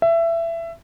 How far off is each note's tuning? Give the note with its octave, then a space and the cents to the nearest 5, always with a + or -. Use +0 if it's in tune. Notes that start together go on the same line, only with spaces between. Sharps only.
E5 +20